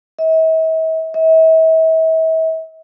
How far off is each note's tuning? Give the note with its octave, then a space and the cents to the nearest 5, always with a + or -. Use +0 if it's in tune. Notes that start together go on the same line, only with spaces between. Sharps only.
E5 -45
E5 -40